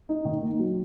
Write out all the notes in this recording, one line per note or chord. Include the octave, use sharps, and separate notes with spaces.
D#4
D#3
A#3
F#3